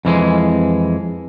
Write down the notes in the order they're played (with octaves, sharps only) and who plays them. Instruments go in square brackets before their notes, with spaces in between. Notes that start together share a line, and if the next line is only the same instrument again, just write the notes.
[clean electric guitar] F2 E3 G#3